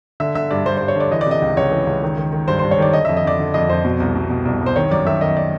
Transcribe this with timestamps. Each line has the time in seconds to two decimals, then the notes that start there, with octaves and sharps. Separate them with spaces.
0.20 D3 E5
0.35 D3 E5
0.51 G2 D5
0.66 G2 C5
0.77 C5
0.81 G2
0.88 C#5
0.96 D3 D5
1.11 E3 D#5
1.21 D5
1.26 C3 D#5
1.42 C#2
1.57 C#2 C#5
1.72 E3
1.87 C#2
2.02 D#3
2.18 D#3
2.33 D#3
2.48 G2 C5
2.59 C5
2.64 G2
2.71 C#5
2.78 D#3 D5
2.93 D3 D#5
3.05 E5
3.09 F2
3.17 D#5
3.25 D3 D5
3.39 D3
3.54 F2 D#5
3.69 F2 C5
3.85 B2
4.00 C2
4.16 B2
4.30 B2
4.45 C2
4.61 C2
4.66 C5
4.76 D#3 C#5
4.91 F#2 D5
5.06 D#3 E5
5.21 D#3 D#5
5.37 D5